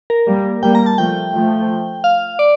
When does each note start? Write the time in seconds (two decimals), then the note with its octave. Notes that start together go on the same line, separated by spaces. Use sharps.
0.10 A#4
0.27 G3 A#3
0.63 G3 A#3 G5
0.75 A#5
0.86 A5
0.98 F3 A3 G5
1.33 F3 A3
2.04 F5
2.39 D5